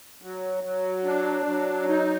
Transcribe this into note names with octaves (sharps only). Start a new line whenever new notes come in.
F#3
F#3
D4
F#3
D#4